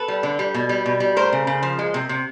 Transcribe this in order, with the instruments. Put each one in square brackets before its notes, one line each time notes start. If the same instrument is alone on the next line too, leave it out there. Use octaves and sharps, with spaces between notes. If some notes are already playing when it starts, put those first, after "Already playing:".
Already playing: [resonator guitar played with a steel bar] A4 B4
G3
D3
G3
B2
G3
B2
G3
A3 A#4 C5
C#3
C#3
F3
G#3
C3
C3